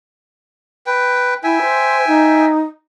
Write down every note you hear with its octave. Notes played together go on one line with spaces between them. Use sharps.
B4 G5
E4 E5 G5 G#5
C5
D#4